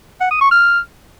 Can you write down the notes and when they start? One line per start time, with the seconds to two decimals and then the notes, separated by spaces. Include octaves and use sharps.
0.20 F#5
0.31 D#6
0.41 C#6
0.51 F6